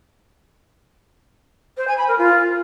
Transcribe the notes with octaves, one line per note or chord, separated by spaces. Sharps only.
C5
G#5
B5
A#4
F4